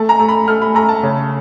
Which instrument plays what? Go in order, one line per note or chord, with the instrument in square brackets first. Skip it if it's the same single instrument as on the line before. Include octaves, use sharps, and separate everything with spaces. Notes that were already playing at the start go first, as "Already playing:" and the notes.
Already playing: [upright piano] A3 A5
A#5
A3
B5
A3 F6
B5
A3 A#5
A5
C#3